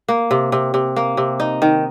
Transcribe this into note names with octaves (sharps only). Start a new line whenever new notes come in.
A#3
C3
C3
C3
A#3
C3
D#4
D#3